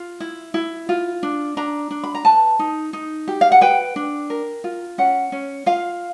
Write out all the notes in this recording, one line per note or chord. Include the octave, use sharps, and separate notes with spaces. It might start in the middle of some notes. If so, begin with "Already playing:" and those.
Already playing: F4
E4
E4
F4
D4
D4 A#5
D4
B5
A#5
B4 A5
D#4
D#4
G4
F5
F#5
B4 G5
D4
A#4
F4
C#4 F#5
C#4
F4 F5